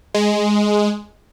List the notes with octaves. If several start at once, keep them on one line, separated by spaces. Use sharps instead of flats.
G#3